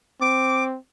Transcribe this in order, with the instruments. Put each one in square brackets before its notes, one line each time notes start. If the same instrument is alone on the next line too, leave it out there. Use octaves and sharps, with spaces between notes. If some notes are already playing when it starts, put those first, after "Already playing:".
[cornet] C4 [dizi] D6